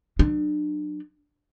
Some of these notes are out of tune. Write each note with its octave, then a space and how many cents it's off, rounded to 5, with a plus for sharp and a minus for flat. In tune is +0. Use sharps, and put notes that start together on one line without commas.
F#3 +0 D4 +35